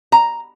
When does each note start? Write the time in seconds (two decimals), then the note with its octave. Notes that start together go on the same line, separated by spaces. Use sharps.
0.12 A#5